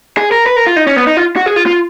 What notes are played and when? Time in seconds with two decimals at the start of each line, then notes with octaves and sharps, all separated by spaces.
0.17 G#4
0.32 A#4
0.46 B4
0.56 A#4
0.66 F4
0.76 D#4
0.87 C#4
0.96 B3
1.07 D#4
1.17 F4
1.36 F#4
1.46 G#4
1.56 F4
1.66 F4